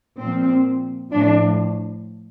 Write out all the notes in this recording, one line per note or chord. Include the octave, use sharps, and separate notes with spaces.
A#2 F3 C4
A2 F3 D4